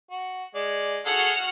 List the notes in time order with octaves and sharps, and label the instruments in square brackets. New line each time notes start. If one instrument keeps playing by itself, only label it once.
[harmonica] F#4
G#3 D5
[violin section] F#4 F#5 F6 [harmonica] G#4 A4